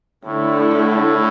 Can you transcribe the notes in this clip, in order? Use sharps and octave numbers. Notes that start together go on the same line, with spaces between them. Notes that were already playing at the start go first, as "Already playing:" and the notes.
A2 D3 A3 E4
A2